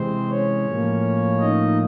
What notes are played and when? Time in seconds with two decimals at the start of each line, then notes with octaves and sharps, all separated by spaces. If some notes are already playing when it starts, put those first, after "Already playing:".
Already playing: C3 E3 G#3 C4 C5
0.29 C#4 C#5
0.66 A2 F3 A#3
1.40 D#4 D#5